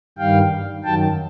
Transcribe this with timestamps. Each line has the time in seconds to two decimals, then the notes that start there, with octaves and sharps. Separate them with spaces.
0.18 G2 D#3 G3 F5 G5
0.84 F#2 D#3 F#3 G5 A5